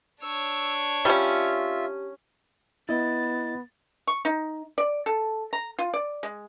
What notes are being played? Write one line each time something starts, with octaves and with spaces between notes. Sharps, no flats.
D4 C#5 E6
G3 C#4 F4 G4 E5
B3 E4 D#5 A6
C#6
D#4
D5
A4
A#5
F4
D5
G#3